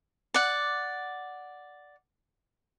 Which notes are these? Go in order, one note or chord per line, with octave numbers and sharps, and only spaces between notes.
D5 F#5